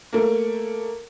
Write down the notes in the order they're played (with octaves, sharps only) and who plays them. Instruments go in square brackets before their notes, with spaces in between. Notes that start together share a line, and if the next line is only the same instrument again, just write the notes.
[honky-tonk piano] A3 A#3